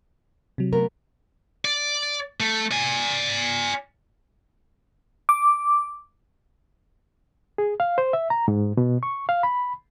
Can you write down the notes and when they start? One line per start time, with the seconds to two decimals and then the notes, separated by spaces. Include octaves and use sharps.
0.58 C3 F#3
0.73 A3 B3 A#4
1.65 D5
2.40 A3
2.71 D5 G#5
5.29 D6
7.58 G#4
7.80 F5
7.98 C5
8.13 E5
8.30 A#5
8.48 G#2
8.77 B2
9.03 C#6
9.29 F5
9.43 B5